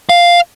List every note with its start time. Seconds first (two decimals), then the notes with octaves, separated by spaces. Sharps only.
0.09 F5